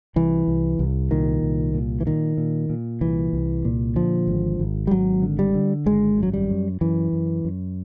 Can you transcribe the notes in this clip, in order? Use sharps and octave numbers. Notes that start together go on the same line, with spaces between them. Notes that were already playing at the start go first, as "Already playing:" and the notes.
C2 E3
C2
C2
A#2 D#3
C2
A#2
E3
A#2 D#3
A#2
A#2
C2 E3
C2
A#2
D3 F3
G#1
G#1
G3
G#1 F#3
D3
G3
D3
G#1 G#3
F#2
F#3
G3
F#2
F#2 E3
F#2
F#2